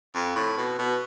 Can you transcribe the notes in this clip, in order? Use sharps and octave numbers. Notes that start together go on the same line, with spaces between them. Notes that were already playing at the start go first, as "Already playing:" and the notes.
F2
A2
B2
B2